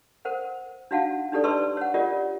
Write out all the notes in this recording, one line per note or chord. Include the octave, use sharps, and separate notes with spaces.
A#4 C5 F#5
D4 D#4 F#4 F5 F#5 A5
D4 D#4 G4 A4 D5
B4 D#5 A5 C6 C#6 E6
C#5 F#5
F4 G4 A#4 D5 D#5 F#5